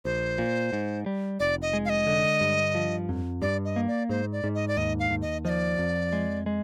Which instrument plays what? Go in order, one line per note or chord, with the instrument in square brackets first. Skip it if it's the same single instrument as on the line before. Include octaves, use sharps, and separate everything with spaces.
[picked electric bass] A#1 [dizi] C5
[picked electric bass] A#2
G#2
G3
[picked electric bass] F1 [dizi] D5
[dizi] D#5
[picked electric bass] G#3
[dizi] F5
D#5
[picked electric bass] D3
G2
F3
F2
[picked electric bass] G2 [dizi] D5
[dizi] D#5
[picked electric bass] A#3
[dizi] D5
[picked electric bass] G#2 [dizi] C5
[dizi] D5
[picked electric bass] G#2
[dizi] D#5
D5
[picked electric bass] D#2 [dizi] D#5
[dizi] F5
[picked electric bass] D#2
[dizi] D#5
[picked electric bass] F3 [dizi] D#5
[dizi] D5
[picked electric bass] F2
G#3
G#3